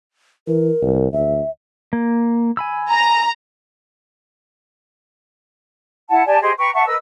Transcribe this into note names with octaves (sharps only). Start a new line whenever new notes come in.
E3 A#4
C2
D2 E5
A#3
G#5 B5 E6
A#5
E4 F#5 A5
G4 D5 G#5 A5
G4 G#4 C5 D#5
B4 G5 A#5 C#6
E5 F#5 A5 C#6
A#4 B4 D#5 E6